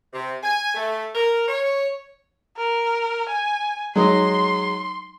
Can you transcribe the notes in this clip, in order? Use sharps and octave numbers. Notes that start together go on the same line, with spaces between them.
C3
G#5
A3
A#4
C#5
A#4
G#5
F#3 G#3 D#4 C6